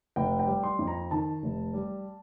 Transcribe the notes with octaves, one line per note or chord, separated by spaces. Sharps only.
F1 G5
G5
G3
C6
F2
A#5
D#3 A5
F1
G3